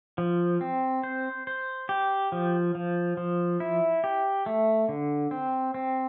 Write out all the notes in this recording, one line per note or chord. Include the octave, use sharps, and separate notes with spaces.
F3
C4
C5
C5
G4
F3
F3
F3
E4
G4
A3
D3
C4
C4